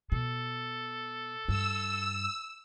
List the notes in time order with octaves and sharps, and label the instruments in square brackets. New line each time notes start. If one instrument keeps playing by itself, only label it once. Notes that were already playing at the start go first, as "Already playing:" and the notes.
[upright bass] B2 [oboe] A4
[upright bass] G2 [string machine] E6